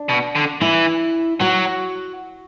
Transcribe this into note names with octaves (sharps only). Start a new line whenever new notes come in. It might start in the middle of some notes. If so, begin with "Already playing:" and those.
Already playing: D4
B2
D3
E3 E4
F#3 F#4